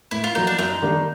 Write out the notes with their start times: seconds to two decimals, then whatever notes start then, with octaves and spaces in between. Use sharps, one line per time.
0.11 A2 E4
0.24 F4
0.35 F#3 A#3 D#4
0.47 D4
0.58 F#2 D#4
0.82 D#3 G3 A#3 D4